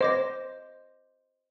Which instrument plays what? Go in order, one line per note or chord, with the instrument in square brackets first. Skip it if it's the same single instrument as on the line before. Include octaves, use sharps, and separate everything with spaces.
[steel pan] C5 [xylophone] D#5 D6 A#6